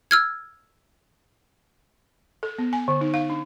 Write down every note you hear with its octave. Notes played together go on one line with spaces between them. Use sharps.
E6 F6 G#6
A4
B3
G#5
D3
D#4
F5
D4